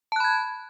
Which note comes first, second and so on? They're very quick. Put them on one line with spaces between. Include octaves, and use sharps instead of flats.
A5 F#6 B5 G#6